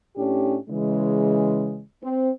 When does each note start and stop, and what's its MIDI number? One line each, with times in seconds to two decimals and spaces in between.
0.17 0.57 45
0.17 0.57 61
0.17 0.57 62
0.17 0.57 67
0.69 1.82 49
0.69 1.82 52
0.69 1.82 56
2.02 2.30 60